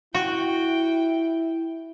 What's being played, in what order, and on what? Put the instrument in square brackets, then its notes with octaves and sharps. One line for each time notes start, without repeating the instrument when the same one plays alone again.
[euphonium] E4 [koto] F#4 [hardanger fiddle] G5